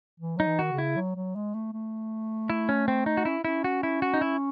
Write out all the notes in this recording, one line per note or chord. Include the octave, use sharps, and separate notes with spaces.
E3
F#3 D#4
E3
D#3 F#4
C#3
E4
F#3
F#3
G#3
A3
A3
E4
C#4
C4
D#4
F#4
C#4 E4
C#4 E4
F#4
E4
F#4
D#4
E4